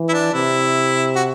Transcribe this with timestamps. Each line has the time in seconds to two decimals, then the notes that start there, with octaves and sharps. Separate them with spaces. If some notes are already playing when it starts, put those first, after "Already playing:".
Already playing: E3
0.09 E4
0.13 D4
0.34 C3 E4
1.16 F#4